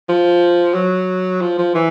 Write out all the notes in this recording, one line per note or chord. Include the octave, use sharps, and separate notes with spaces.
F3
F#3
F3
F3
E3